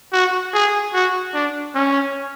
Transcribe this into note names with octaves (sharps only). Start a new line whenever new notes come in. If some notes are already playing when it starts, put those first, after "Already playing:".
F#4
G#4
F#4
D4
C#4